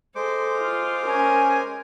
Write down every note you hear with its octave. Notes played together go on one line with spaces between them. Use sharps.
G#3 A4 C5 D6
F4
C#4 A#4 G#5